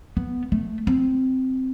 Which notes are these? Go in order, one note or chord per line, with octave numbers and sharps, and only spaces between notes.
B3
A3
C4